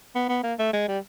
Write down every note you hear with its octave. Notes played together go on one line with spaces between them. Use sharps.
B3
B3
A#3
A3
G#3
G3